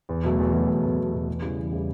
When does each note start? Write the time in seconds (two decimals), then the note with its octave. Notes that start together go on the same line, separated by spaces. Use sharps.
0.09 E2
0.24 B2 F#3 A3
0.38 E2
0.53 B2 F#3 A3
0.68 E2
0.83 B2 F#3 A3
0.98 E2
1.13 B2 F#3 A3
1.28 E2
1.42 C#3 E3 G3
1.58 E2
1.73 C#3 E3 G3